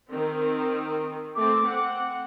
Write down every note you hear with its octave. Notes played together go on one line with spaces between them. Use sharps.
D#3 C4
A3 C4 D6
C4 F#5